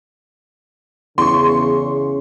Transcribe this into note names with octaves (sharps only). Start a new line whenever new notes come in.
E2 C#3 C6 C#6